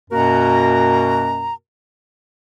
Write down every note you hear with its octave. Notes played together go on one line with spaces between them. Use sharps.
F#2 B2 A#3 F#4 A#4 A#5